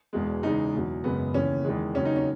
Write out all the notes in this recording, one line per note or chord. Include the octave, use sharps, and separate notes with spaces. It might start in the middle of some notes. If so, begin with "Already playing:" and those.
E1 E2 B2 G#3
E2 C#3 G#3 D#4
E2 B2 F#3
F#1 F#2 C#3 G#3 B3
D#2 C#3 E3 C#4
E2 D#3 G#3
D#2 C#3 F#3 C#4
D#4
C#4